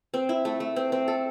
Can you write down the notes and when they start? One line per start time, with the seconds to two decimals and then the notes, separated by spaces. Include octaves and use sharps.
0.14 C4
0.29 E4
0.45 A3
0.60 A3
0.76 C4
0.92 C4
1.08 A4